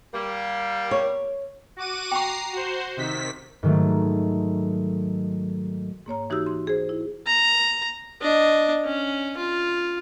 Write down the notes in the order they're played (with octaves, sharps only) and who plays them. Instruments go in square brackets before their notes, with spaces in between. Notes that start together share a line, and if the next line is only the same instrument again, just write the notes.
[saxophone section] G3 A#3
[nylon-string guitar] C#5
[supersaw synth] F#4 D6 D#7
[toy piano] G5 C#6 [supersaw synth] A#5 C7
[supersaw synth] F#4 C5
C3 D#3 B6
[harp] G#2 D#3 F#3 A3
[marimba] G#2 A#3 C#5 A#5
E3 D#4 F#4 G4 E6
C6
G#4 C5
E4
[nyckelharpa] A#5
D4 D#5
C#4
F4